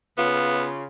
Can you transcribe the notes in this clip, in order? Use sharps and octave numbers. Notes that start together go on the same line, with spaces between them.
C#3 B3 F4